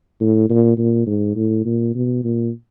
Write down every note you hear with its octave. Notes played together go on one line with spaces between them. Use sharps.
A2
A#2
A#2
G#2
A2
A#2
B2
A#2